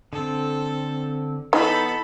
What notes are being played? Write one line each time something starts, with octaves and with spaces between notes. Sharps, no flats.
D3 C4 A4
E3 B3 D#4 A4 C#5 B5